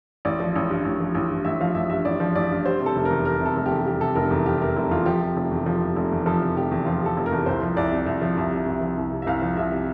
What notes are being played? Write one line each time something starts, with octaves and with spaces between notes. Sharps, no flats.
A1 D5
F3
A1
G2
A1
F3
A1
G2
A1 E5
F3 F5
A1 E5
G2 E5
A1 D5
F3
A1 D5
G2
G3 C5
C3
A4
F1
A#4
E2
G3 A#4
C3 A4
F1
G4
E2
G3 G4
C3 A4
F1 A#4
E2
G3 G4
C3 A#4
F1
E2 F4
F3 G4
C3
F1
E2
F3
C3
F1
E2
F3 A4
C3
F1 G4
E2
F3 F4
C3 A4
F1
A#4
E2
C2 C5
F3
C2 D5
C3
C2
F3
C2
C3
C2
F3
C2
C3
E5
C2 F5
F3
C2 E5
C3